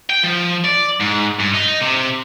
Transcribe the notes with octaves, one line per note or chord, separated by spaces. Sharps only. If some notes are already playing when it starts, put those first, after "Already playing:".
G5
F3
D5
G#2
G2
D#4
C3